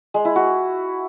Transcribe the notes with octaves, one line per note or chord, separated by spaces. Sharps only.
G#3
E4
F#4